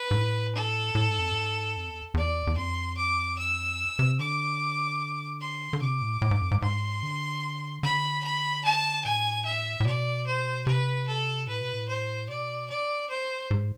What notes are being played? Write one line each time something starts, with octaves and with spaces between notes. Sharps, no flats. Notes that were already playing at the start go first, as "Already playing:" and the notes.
Already playing: B4
G#2
A2
A4
A2
G#2
F2
G#2
F2
E2
E2 D5
E2
F2 C6
D6
E6
C3
D3 D6
C6
D3
C3 D6
A2
A2
G#2
F2
G#2
G#2 C6
D3
D3 B5
B5
A5
A2 G#5
E5
A2
B2 D5
C5
C3 B4
A4
A2 B4
B2
A2
C5
B2 D5
D5
C5
G#2